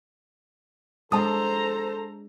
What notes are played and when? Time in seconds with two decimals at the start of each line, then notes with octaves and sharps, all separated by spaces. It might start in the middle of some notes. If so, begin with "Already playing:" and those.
1.12 G#3 D4 A4 C5 A5 A#5 D#6